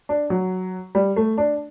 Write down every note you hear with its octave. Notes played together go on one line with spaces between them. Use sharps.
D4
F#3
G3
A3
D4